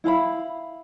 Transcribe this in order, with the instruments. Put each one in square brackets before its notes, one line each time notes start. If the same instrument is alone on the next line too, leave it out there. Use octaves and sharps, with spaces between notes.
[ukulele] E4 F5 A#5 B5